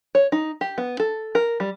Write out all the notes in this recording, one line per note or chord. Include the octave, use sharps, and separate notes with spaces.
C#5
D#4
G4
B3
A4
A#4
G3